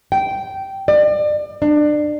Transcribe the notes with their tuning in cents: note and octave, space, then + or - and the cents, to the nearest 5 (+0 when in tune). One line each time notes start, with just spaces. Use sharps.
G5 -15
D5 +35
D4 +25